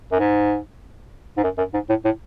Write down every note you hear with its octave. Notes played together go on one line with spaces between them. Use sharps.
F#2
G#2
G#2
F#2
F#2
G#2
A2
A2